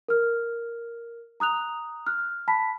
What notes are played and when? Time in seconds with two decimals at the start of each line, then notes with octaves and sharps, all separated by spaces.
0.08 A#4 F6
1.40 A#5 D#6 F#6 F7
2.07 F6 F#6
2.48 A5 B5 B6